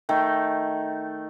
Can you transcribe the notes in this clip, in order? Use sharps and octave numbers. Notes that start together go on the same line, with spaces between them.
D#3 A3